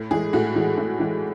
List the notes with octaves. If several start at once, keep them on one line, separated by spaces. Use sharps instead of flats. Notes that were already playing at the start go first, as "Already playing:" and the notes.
Already playing: A2
E3 G#3 G#4
A2 F#4
E3 G#3
A2
E3 G#3